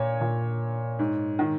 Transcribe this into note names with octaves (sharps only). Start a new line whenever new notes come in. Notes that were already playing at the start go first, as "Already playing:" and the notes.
Already playing: A#2 C#5
A#2
G#2
D#3